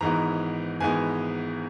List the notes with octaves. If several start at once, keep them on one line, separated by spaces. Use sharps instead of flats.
G#1 G#2 E3 G#3 B3 A#5
G#1 G#2 E3 G#3 B3 G#5